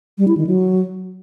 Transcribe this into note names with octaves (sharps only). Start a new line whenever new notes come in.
G3
E4
D#3
F#3